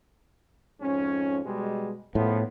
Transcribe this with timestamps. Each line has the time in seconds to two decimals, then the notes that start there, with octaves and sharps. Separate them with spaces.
0.80 F2 G#2 C#4
1.45 B2 G3 G#3
2.15 A#1 A2 F3 B3